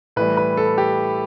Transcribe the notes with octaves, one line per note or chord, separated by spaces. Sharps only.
A2 E3 G3 B4
B4
A4
G4